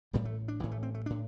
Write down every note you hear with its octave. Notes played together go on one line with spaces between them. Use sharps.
A1 A2 G3
A3
D4
A1 A2 E3
A3
C4
A3
A2 D4